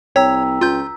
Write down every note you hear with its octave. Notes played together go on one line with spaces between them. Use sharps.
C2 C#5 G5 A#5 E6 B6
C#2 F4 G6